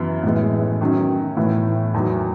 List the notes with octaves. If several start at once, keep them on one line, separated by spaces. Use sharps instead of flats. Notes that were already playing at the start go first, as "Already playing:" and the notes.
Already playing: F#2 C#3 E3 B3
A2 E3 G#3 B3
D#3 F#3 C#4
A2 E3 B3
E2 D#3 F#3